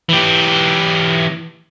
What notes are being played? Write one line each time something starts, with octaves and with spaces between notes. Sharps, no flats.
E3 G4